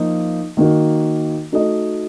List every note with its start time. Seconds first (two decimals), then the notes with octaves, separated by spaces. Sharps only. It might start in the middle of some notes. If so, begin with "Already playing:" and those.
Already playing: F3 A#3 D#4
0.57 D#3 A#3 D#4 F#4
1.52 A3 D#4 F#4 A4 D#5